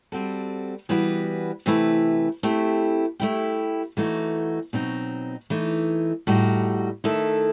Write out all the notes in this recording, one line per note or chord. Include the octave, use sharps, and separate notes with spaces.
G3 C4 F#4 A4
E3 G3 B3 F#4 B4
C3 E3 A3 E4 B4
A3 C4 E4 G4
A3 E4 G4
E3 A3 D#4 F#4
B2 F#3 C4 D#4
E3 A3 D#4
A2 G3 D#4 F#4
D#3 A3 E4 A4